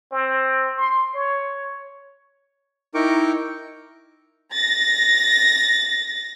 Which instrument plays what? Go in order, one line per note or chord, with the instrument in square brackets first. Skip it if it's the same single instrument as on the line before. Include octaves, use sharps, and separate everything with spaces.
[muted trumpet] C4
C6
C#5
[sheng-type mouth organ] D#4 E4 A#4 G5 C#6 D6
[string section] A6 A#6